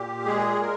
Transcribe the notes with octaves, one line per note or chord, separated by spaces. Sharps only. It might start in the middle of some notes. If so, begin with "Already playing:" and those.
Already playing: A#2 G4
G#3 G#4
A#4